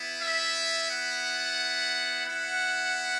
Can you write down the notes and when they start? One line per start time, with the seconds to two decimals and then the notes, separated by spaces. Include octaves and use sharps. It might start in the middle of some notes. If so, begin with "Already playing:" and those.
Already playing: B3 E4
0.21 E5
0.90 F#5
2.26 B3 E4 F#5